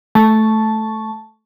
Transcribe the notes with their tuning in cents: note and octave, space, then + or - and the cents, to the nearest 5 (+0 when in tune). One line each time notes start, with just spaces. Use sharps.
A3 -10 A5 -5 C#6 +0